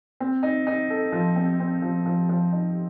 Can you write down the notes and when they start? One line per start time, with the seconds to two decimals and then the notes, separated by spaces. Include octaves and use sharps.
0.20 C4
0.43 D#4
0.67 D#4
0.90 A4
1.12 F3
1.36 C4
1.60 C4
1.82 F3
2.06 F3
2.29 F3
2.52 D#4